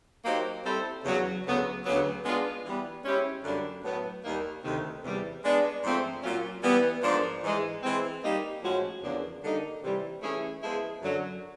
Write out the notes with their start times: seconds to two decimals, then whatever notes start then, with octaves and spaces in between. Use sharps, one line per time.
0.24 F#3 A#3 D#4 G4 C5
0.64 G3 C4 E4 A4 C5
1.04 E2 C#3 F#3
1.45 D2 C#3 F#3 B3
1.84 D2 C#3 F#3 B3
2.24 G#3 B3 D4 F4 G#4
2.64 E3 G3 B3
3.03 G#3 C#4 E4 G4 C5
3.43 F#2 D3 G3 A#3 D4
3.83 A2 F#3 B3
4.24 D#2 D#3 G3 A#3 D#4
4.63 D2 C3 D#3
5.03 E2 C3 E3 G3
5.43 G#3 B3 D4
5.83 G#2 F3 A3 C4
6.23 A#2 F#3 A#3 C#4 F4
6.63 E3 G3 B3
7.03 G#2 F3 A#3 D4
7.43 G#2 E3 G#3
7.82 E3 G#3 C4
8.22 G3 A#3 D#4
8.62 A2 F3 G#3 C#4 F#4
9.02 E2 C#3 F3 A#3 D4
9.42 D3 G3 A#3 D#4
9.83 C3 E3 G3
10.22 E3 A3 C#4 E4 G#4
10.62 F3 G#3 B3 E4 G#4
11.02 F#2 D3 F#3